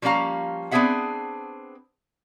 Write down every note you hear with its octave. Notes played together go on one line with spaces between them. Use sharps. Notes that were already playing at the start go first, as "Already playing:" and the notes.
F3 G3 A#3 C#4 F5 A#5
B3 C4 D4 G#4 E5 F#5